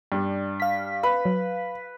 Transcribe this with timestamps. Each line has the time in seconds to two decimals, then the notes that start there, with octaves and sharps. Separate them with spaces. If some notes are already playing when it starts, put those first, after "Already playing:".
0.12 G2 D4
0.60 F5 B6
1.03 B4 B5
1.25 F#3